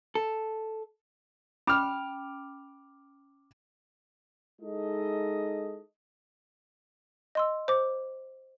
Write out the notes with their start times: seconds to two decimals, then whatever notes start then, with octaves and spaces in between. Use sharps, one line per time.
0.15 A4
1.67 C#4 G5 B5 D6 F6
4.62 G#3 D#4 E4 A4 D#5
7.35 D#5 C6 E6
7.68 C5 D6